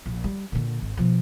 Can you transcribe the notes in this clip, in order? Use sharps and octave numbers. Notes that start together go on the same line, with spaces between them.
A#1
G3
A#2 D3
G#1
B2 F3